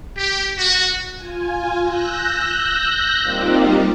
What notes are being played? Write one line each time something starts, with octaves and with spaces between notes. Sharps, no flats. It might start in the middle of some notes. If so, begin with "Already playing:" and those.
G4
F#4
F4 G#5
E6 F#6 G6 A#6
G3 A#3 C4 D#4 F4 G4